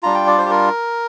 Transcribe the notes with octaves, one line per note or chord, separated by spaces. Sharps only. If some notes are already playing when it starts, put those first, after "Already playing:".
G3 D4 F4 A#5
G5
D5
C5
G4
A#4